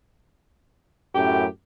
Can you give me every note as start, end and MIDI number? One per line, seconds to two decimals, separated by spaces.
1.15 1.45 42
1.15 1.45 45
1.15 1.44 67